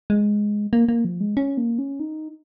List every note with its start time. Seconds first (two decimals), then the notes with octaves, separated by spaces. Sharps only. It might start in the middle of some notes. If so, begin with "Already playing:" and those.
0.10 G#3
0.73 A#3
0.89 A#3
1.05 F3
1.21 G#3
1.37 C#4
1.58 A#3
1.79 C#4
2.00 D#4